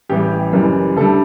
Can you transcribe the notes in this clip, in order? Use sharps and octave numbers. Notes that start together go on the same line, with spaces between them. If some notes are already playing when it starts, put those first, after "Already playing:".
A1 A2 E3 G3 G4
F#1 F#2 E3 G3
D2 D3 G3 A4